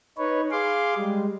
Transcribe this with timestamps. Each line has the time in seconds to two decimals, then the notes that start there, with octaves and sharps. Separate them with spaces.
0.18 D#4 B4 C#5
0.52 G#4 F5 C6 D6
0.95 G3 G#3